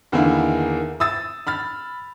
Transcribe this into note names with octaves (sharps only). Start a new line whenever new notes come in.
E2 D3 D#3 A#3 E4
D#6 E6 A6
B5 F6 A6